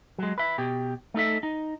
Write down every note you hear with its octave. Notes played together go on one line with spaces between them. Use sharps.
F#3 G#3
B4 E5
B2 G4
A3 D#4 A4 E5
D#4